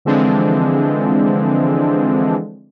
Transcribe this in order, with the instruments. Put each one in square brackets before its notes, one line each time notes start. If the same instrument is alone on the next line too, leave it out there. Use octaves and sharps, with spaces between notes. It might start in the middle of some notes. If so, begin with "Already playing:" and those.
[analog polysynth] D3 E3 F3 G#3 C4 D4